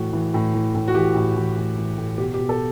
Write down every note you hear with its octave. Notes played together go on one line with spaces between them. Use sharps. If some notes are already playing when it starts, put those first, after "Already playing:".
Already playing: A2 E3 F#4
E3
A2
E3
A2
F#4
E3 G4
A2
E3
A2
E3
A2
B2 G4
G4
B2
A4